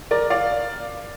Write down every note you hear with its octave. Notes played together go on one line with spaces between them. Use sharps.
A#4 D5
D5 F5